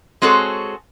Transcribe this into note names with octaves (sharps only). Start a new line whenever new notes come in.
G#3 C4 F#4 G#4 A4 C#5